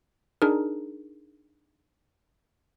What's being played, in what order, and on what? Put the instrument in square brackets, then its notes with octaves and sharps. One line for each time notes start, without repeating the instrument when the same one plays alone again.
[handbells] D4 D#4 G#4 A#4